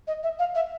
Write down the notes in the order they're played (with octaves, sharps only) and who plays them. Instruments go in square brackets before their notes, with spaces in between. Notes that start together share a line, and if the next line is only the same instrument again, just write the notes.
[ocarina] D#5
E5
F5
E5